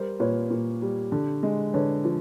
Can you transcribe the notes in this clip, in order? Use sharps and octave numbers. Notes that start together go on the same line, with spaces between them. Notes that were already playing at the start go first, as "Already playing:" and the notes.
Already playing: G3 A#4 C5
A#2 B4 C#5
A#2
G3
D3
G#3
D3 B4 C#5
F3